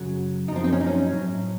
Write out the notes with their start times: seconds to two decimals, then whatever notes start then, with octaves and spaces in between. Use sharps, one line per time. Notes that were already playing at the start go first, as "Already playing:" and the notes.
Already playing: F#2 C#3 F#3
0.48 F#2 D#4
0.52 F3 C4
0.64 C4
0.73 C#4
0.80 D#4
0.87 C#4
1.12 A2 F#3